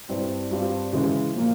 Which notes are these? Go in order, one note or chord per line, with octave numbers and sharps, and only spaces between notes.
G2 G3 C4 E4
G2 G3 C4 F4
C#3 E3 G#3 C#4 E4
A#2 F3 A#3